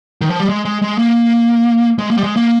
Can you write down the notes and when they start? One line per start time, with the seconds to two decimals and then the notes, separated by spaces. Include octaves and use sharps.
0.21 D#3
0.30 F3
0.40 G3
0.49 G#3
0.65 G#3
0.82 G#3
0.98 A#3
1.99 G#3
2.11 A#3
2.17 G3
2.23 G#3
2.36 A#3